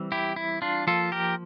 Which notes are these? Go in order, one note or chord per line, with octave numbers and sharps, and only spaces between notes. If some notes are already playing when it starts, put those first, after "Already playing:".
Already playing: E3 G3 C4
E4 G4
E4
D4 F4
F3 A#3 F4 A4
G4 A#4